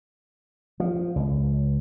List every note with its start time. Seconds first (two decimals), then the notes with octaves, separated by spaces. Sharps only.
0.80 F3
1.16 C#2